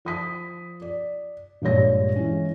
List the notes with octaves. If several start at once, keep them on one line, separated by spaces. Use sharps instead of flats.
F3 D#6 B6
D5
A#1 G2 G#3 C#5 A#6
E3 G#3 C#4